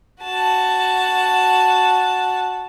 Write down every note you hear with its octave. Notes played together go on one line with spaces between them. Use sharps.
F#4 A5